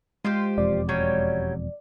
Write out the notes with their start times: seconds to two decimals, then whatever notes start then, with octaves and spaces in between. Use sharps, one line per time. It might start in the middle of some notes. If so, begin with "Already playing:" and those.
0.25 G#3 F4 G4 C5
0.58 E1 F2 D5
0.89 F#3 G3 C#4